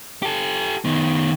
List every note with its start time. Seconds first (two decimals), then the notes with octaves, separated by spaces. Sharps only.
0.22 G4 A4
0.85 D#3 B3